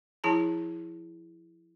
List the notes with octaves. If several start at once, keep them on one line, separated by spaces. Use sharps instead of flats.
F3 E4 G#4 A5 A#5